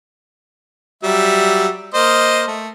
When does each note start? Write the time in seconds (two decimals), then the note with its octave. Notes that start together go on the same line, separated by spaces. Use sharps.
1.03 F#3 G3 E5
1.94 A#3 C5 D#5
2.47 A3